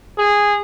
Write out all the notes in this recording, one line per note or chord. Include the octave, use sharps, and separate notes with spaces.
G#4